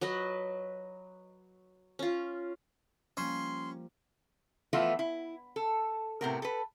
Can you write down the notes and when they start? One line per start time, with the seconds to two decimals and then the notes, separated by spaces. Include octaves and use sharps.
0.01 F#3 B4 D#5
1.99 C#4 F4
3.17 F3 G3 A#3 C#4 C6
4.73 E3 F3 A3 B3 E4 F4
4.99 E4
5.56 A4
6.21 A2 C3 B3 A#4
6.42 A4 B4